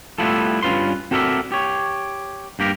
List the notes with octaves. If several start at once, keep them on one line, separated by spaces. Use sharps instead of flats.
G3 A3 B3 E4 F4 A4
G2 C#4 F4 B4 C6
C4 F#4 A4 A#4 D5 E5
G4 C#5
G2 A#3 G4 A#4